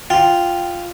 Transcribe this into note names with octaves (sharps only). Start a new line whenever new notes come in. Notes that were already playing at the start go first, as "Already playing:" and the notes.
F4 G5